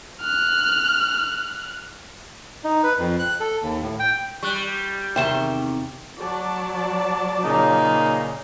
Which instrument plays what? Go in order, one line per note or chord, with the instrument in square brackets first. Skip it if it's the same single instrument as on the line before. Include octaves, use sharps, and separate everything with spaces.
[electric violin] F6 F#6
[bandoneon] D#4
B4
F2
F#6
A4
D#2
A2
G5
[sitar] G3 [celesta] C#6 F#6
[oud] E2 C3 D#3 [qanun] E5 C6 C#6 [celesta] G5 E7
[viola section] F#3 D5 A5
[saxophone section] A#2 C#3 [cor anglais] D#4